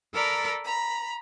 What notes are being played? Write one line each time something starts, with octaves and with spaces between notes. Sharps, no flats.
A4 A#4 D5 A#5 B5
A#5 B5